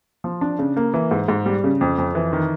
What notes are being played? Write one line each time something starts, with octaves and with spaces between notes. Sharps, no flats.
F3
D4
C#3
A#3
E3
G#2
G#2
G3
C#3
F2
F2
E3
D#3